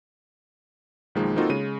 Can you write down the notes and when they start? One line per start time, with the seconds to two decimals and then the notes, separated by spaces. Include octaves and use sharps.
1.15 B1 D#3 F3 G#3 A#3
1.36 A#3 C4 D#4 F4 F#4 A4
1.50 C#3 G#3 D#7